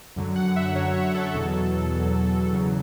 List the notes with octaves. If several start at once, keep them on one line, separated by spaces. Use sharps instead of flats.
F#2 D3 F#3
F#5
E5
F#2 D3 F#3 C#5
C#5
A4
E2 B2 F#3 A4
E2 B2 F#3
E2 C#3 F#3